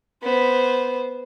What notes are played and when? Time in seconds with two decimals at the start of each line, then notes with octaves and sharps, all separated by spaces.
0.23 B3 C5